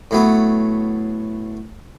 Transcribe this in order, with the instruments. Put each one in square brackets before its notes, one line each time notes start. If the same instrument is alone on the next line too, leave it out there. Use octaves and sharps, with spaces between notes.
[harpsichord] A2 F#3 B3